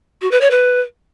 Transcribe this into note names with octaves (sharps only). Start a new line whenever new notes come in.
F#4
B4
C#5
B4